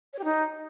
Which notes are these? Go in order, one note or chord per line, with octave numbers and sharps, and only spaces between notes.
C#5
G4
D#4